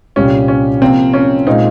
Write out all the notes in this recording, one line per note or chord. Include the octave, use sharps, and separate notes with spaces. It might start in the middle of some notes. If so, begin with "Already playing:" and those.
C2 A#2 G3 C4 C#4 G4
C#4
C3 F3 A#3 C4 F4
C#4
A#2 G#3 C4 D#4